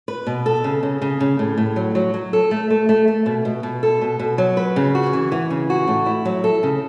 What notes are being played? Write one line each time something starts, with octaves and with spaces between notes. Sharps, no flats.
B4
B2
A4
C#3
C#3
C#3
C#3
A2
A2
F#3
F#3
F#3
A4
A3
A3
A3
A3
B2
B2
B2
A4
B2
B2
F#3
B4
C#3
F#4
E3
E3
C#3
F#4
A2
E4
F#3
A4
C#3